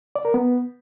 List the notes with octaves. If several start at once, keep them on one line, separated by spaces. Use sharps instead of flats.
D5
A#4
B3